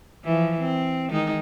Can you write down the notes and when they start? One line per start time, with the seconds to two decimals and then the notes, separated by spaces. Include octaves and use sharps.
0.24 E3 F3
0.61 C4
1.10 D#3 G#3 D#4